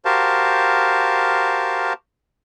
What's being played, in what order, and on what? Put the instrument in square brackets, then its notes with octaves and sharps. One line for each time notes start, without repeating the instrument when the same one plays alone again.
[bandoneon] F#4 G4 A#4 C5 F5 A5